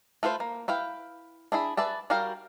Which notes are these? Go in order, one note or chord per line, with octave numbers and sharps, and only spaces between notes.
A3 F4 B4 C5
A#3
E4 B4 F5 G5
D4 E4 G#4 B5
G#4 B4 D5 E5 A5
G3 F#4 A#4 F5 G5